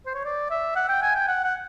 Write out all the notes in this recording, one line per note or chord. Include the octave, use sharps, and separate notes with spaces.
C5
C#5
D5
E5
F#5
G5
G#5
G5
F#5
F#5